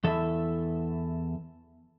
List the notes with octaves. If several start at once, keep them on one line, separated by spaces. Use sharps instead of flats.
E2 E3 A4 E5